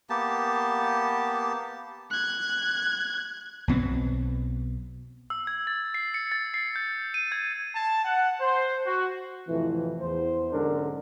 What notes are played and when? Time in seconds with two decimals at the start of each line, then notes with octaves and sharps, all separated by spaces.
0.10 A#3 B3 G4 A5
2.11 F#6 G#6
3.68 B1 B2 B3 C4
5.30 E6
5.47 G#6
5.67 A6
5.94 C7
6.14 C#7
6.32 A6
6.54 C7
6.76 G6
7.14 D#7
7.32 G#6
7.75 A5
8.05 F#5
8.40 C5
8.86 F#4
9.48 F2 A2 C3 E3
10.01 E2 C5
10.52 B1 G#2 D3 C#4 D4 A#4